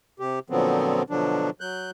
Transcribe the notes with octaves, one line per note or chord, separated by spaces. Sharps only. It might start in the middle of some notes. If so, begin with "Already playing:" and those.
C3 G4
A#2 D3 F3 F#3 B3 C4
B2 D3 F3 F#3 D4
F#3 F#6 G6